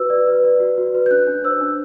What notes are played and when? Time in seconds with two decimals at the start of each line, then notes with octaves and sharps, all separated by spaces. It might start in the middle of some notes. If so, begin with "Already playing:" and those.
Already playing: F#4 B4 E6
0.10 D5
0.27 B4
0.44 D5
0.60 F#4
0.78 F#4
0.94 B4
1.06 G6
1.11 D4 F#6
1.27 D4
1.44 C5 E6
1.61 D4